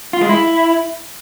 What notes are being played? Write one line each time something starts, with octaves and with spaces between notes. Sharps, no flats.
F4
G#3
E4